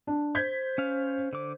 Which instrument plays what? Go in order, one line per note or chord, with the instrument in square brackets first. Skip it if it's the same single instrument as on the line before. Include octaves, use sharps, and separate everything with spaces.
[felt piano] D4
[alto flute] C5 [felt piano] G6 G#6 B6
[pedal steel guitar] C#4 F5
D3 D6